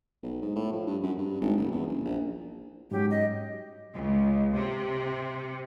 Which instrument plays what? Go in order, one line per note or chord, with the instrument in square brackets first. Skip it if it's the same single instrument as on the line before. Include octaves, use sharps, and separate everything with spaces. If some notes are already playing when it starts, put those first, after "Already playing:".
[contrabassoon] B1
G#2
A2
F3
G2
F#2
G2
G#1
F#1
E2
F#1
A#1
[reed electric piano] G#2 F#3 C#4 [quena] G4
[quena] D#5
[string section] C#2
C3